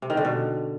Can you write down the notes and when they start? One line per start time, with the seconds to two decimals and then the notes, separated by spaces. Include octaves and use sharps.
0.02 C3
0.10 D#3
0.17 D3
0.25 B2